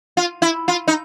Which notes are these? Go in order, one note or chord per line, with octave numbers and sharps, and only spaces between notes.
F4
E4
F4
D#4